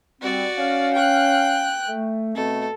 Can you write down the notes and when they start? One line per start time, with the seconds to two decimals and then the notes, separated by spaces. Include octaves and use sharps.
0.21 G3 C4 F#4 D5
0.57 C#4 F5
0.93 G5 F#6
1.88 A3
2.35 B2 A3 C4 A4